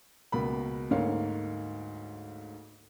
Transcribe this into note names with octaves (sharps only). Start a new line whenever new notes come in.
C#2 B2 A#3 B5
D2 G#2 A#3 C#5 F5